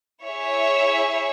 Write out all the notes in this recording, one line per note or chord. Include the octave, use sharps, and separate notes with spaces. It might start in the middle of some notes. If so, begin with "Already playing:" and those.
E4 G#4 C#5 E5